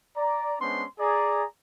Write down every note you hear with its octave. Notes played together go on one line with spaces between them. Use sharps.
D5 A#5
G#3 B3 C#4 D4 C5 C6
G#4 D5 A#5